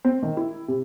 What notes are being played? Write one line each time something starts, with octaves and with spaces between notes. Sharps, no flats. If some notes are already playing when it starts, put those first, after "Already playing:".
C4
D#3
E4
C3